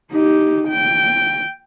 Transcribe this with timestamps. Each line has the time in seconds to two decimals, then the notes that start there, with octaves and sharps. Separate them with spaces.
0.12 D#4 G4
0.68 G5